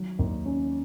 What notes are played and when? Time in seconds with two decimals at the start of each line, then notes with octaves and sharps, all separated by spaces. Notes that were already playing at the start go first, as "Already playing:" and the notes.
Already playing: D#3 F#3
0.19 D#2
0.46 C#4